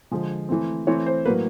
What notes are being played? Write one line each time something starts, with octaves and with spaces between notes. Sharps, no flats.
D3 F3 G#3
E3 A3 C4
E3 A3 C4 C#5
C5
A2 F#3 A#3 B4